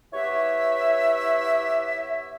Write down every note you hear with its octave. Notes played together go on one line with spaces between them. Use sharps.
B3 E4 G4 B4 C#5 E5